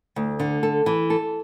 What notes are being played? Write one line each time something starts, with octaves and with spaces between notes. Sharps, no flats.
D2
D3
A4
E3
A4